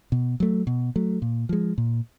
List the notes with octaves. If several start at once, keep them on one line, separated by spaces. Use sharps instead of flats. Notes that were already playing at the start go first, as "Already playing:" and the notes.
B2
F#3 A3
B2
F#3 A3
A#2
F3 G#3
A#2